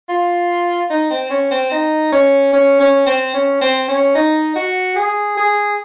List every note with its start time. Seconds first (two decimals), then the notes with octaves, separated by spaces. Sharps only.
0.09 F4
0.90 D#4
1.10 C4
1.30 C#4
1.51 C4
1.72 D#4
2.12 C#4
2.53 C#4
2.80 C#4
3.07 C4
3.34 C#4
3.61 C4
3.88 C#4
4.15 D#4
4.56 F#4
4.96 G#4
5.37 G#4